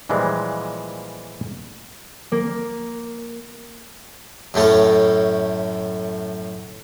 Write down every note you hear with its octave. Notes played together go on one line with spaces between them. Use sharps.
A#2 E3 F3 G3 G#3
A#3
F#2 A2 A3 C#4